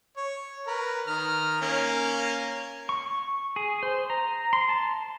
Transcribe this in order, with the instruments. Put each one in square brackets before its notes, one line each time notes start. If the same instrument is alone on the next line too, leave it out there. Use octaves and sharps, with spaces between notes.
[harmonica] C#5
A#4 B4 B5
D#3 A#5 F6
A#3 C#4
[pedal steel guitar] C#6
G#4
C5
A#5
C6
A5